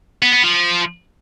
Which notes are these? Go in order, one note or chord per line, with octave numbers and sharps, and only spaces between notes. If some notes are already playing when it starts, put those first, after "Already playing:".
B3
B3
F3